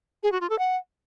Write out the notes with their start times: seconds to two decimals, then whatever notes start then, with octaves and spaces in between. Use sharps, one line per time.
0.23 G#4
0.32 F#4
0.41 F4
0.50 A4
0.58 F#5